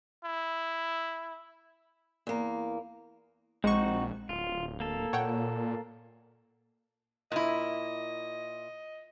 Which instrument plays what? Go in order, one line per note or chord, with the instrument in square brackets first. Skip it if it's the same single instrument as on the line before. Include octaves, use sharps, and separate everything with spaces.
[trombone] E4
[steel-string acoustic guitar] E2 A#3
[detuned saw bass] A#1 [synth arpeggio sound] G#3 C#6 [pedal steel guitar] C4 D#4 F#4
[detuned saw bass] D1 [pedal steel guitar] F4
[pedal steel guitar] A#3 A4
[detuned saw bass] A#2 [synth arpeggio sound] C#5 F#5 G5
[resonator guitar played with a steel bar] A#2 E4 [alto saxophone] D#5